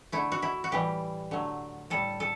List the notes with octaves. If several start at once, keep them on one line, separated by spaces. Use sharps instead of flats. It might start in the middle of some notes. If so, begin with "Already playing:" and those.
D3 A3 E4
F#4
E4
F#4
A2 E3 G3 G4
D3 F#3 A3
A2 G3 A4
A4